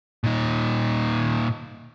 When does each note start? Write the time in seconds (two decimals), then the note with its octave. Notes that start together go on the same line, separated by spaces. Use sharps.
0.24 A#2 D#4